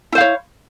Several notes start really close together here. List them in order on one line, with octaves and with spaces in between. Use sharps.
E4 C5 F5 C#5